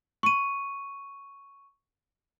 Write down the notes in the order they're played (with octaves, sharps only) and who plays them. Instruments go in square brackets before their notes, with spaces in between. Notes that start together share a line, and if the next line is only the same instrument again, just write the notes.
[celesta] C#6 D#7